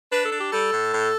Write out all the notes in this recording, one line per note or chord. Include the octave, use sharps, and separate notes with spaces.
D4 B4
A4
D4
G4
G3 A4
A2
A2